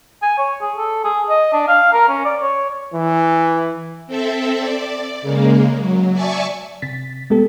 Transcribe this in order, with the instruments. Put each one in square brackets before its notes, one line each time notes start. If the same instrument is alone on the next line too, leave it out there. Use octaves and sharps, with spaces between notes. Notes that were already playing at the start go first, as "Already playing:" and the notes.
[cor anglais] G#5
C#5
G#4
A4
G#4
D#5
D4
F5
A#4
C#4
D5
C#5
[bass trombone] E3
[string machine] C4 A4 E5
D5
C#3 G#3 A#3
F#3
D5 E5 G#5 A5 C#6
[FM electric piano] C3 A6 B6
G#3 A3 B3 G4 A4